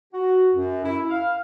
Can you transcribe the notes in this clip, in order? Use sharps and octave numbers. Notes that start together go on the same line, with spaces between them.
F#4
F#2
E4
F5